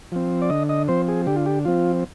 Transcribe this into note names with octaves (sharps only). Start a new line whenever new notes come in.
F3 C4
D5
D3 D#5
D#5
F3 C4 C5
G#4
D3 G4
F4
G4
F3 C4 F4